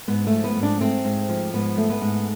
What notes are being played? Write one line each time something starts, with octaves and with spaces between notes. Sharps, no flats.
G#2 B3
A3
F3
B3
G#2
D4
A3 C4
G#2
F3
G#2 B3
A3
B3
G#2